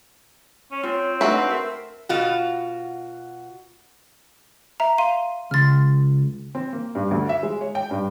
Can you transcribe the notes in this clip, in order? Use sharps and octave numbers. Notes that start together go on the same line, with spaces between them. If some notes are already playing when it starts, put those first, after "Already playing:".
C#4 C#5
C4 F4
A3 D4 D#4 F#4 B4
A#4 E5
B2 F4 F#4
E5 A#5
F5 C6 D#7
C#2 C6 F6 A6
C4
A#3
G2
D2
E5
G#3
C#5
G5
G2